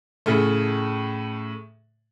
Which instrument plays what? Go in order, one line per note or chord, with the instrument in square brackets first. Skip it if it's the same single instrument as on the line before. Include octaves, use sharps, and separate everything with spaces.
[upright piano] A2 C#3 A3